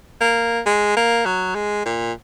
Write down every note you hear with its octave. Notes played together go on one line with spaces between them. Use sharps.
A#3
G#3
A#3
F#3
G#3
A#2